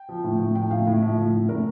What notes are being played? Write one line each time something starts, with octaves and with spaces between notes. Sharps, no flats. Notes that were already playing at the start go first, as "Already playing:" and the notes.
Already playing: G5
F3
A2
A2
F3 G5
A2 F5
A2
F3 E5
A2
A2
A2 A#4